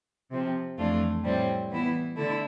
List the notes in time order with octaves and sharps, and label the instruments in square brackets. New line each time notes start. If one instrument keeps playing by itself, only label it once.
[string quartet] C3 F3 C4
F2 E3 A3 D4 F4
A2 G3 C4
E3 B3 E4
D3 A3 E4